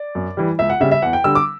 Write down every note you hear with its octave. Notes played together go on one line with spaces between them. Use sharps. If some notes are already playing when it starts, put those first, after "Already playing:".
Already playing: D5
F#2
E3 G3
C#2 E5
F#5
C#3 G3 E5
E5
E2 F#5
G5
D3 G3 E6
D6